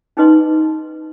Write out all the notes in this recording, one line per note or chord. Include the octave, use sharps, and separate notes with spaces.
C#4 D#4 G#4 B4 D#5 C6